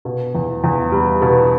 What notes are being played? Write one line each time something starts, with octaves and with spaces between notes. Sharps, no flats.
B2
E2
E2
G3
B2